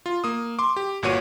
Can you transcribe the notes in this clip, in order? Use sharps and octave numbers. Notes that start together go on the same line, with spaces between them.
F4
A#3 D#6
C6 D6
G4
G1 A#2 F#4 C#5 D#7